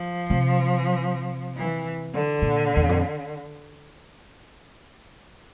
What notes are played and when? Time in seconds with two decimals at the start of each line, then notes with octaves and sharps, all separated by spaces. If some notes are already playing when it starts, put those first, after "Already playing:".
Already playing: F3
0.30 C3
1.57 E3
2.14 D3
2.42 A#2
2.76 E2
2.89 F2